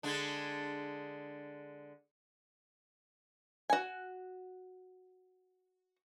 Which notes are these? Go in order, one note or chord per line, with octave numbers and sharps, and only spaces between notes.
D3 G#3 D4
F#4 G#5